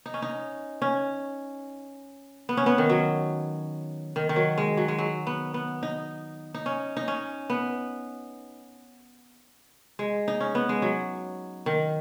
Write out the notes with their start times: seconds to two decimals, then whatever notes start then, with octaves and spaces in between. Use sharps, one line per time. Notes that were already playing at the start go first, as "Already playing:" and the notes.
0.06 D#4
0.14 C#4
0.22 D#4
0.82 C#4
2.49 B3
2.57 C#4
2.66 B3
2.78 D#3
2.89 F#3
4.16 D#3
4.29 D#3
4.36 F#3
4.58 G#3
4.77 F#3
4.88 G#3
4.98 F#3
5.27 B3
5.54 B3
5.83 D#4
6.54 D#4
6.66 C#4
6.97 D#4
7.08 C#4
7.50 B3
9.99 G#3
10.28 D#4
10.41 C#4
10.55 B3
10.69 G#3
10.82 F#3
11.66 D#3